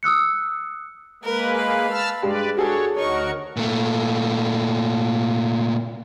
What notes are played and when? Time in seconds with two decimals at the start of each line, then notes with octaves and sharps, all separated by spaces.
0.03 D#6 E6 F#6 C#7
1.23 G#3 A#3 A#4 B4
1.56 F5 B5
1.90 A5 E6 F6
2.22 G2 G#3 G4 B4 D5
2.57 D4 F#4 G#4 A4 C#5
2.96 D2 D#4 F#4 A#4 C#5 C#6
3.57 A#2 A3